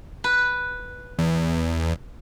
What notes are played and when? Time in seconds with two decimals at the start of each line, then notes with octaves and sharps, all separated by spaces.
0.24 B4
1.19 E2